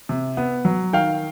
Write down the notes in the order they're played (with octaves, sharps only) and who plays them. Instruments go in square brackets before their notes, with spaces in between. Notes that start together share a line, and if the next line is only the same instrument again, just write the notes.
[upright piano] C3
B3
F#3
D#3 F5 G5